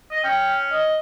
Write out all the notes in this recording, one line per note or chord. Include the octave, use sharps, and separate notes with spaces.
D#5
C#4 G5
D#5